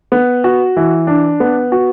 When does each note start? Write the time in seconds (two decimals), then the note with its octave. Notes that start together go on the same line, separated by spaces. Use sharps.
0.12 B3
0.44 F#4
0.76 E3
1.07 D4
1.40 B3
1.72 F#4